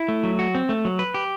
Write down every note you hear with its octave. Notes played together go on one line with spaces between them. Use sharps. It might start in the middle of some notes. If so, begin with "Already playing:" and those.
Already playing: E4
A3
F#3
F#4
C4
A3
F#3
B4
G4